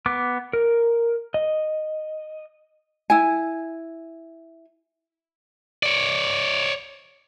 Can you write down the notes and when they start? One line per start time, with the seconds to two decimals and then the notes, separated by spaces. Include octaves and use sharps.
0.06 B3 D6
0.53 A#4
1.34 D#5
3.10 E4 G#5
5.83 C#5 D5